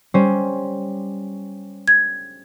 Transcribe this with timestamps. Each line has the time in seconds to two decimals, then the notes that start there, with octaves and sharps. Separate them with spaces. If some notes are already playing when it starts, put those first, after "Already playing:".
0.14 G3 C#4 C5
1.88 G#6